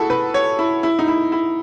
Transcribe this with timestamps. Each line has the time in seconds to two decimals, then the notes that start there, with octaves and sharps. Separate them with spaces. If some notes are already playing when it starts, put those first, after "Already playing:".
Already playing: E4 F#4 G#4 A4
0.10 B4
0.34 C#5
0.59 E4
0.83 E4
0.99 D#4
1.08 E4
1.32 E4